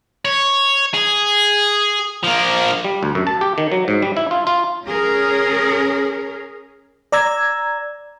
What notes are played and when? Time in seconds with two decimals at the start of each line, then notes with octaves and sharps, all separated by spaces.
0.25 C#5
0.94 G#4
2.24 F3 A#3
2.85 G3
3.03 D2
3.15 F#2
3.27 A5
3.41 G4
3.58 D#3
3.72 F#3
3.88 G#2
4.02 G3
4.17 E4
4.31 F4
4.47 F4
4.84 C#4 G#4 A#4
7.12 D5 A#5 E6 G#6